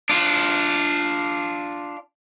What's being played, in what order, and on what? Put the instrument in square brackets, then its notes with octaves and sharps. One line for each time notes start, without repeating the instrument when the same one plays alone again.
[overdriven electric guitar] D4 F4